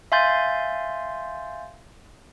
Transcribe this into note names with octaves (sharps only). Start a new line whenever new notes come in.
E5 F5 G#5 C6 G6 A6